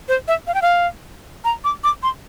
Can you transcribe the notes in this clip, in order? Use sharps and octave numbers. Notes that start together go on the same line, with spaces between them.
C5
E5
F5
G5
F5
A#5
D6
D6
C6